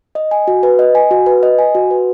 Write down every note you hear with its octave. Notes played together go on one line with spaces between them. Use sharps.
D#5
G#5
F#4
B4
D#5
G#5
F#4
B4
D#5
G#5
F#4
B4